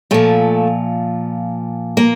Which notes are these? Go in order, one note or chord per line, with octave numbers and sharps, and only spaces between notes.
A#2 F3 A3
A#3